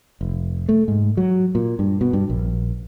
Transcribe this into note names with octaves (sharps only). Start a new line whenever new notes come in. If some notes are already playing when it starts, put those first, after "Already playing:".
F1
A3
G#2
F#3
A#2
G2
B2
G2
A#1